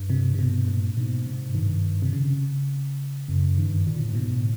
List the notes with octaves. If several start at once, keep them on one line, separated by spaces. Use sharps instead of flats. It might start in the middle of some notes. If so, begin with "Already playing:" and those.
Already playing: G2
C3
C3
B2
A#2
G#2 B2
C3
G2 D#3
C3
C#3
F#2 C#3
G2 D#3
A#2 D3
A2
A#2
G#2 B2
A2